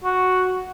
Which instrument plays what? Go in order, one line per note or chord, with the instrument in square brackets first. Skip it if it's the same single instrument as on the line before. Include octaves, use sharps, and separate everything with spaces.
[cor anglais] F#4